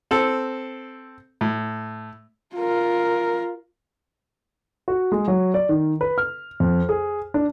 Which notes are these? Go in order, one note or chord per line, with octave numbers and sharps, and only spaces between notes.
C4 A4
A2
F4 A#4
F#4
G#3
F#3
D5
D#3
B4
F6
F2
G#4
D4